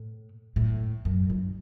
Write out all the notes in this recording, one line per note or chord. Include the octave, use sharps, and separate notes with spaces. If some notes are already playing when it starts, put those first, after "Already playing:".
Already playing: A2
A2
F#2
G2